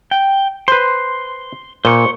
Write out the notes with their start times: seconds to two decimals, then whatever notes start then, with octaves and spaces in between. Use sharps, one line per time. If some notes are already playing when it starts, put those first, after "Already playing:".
0.11 G5
0.68 B4 C5 C6
1.85 A#2 C5 C#6